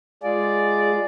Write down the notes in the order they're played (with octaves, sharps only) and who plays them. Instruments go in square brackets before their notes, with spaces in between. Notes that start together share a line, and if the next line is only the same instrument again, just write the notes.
[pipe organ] G#3 F4 G#4 [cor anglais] D5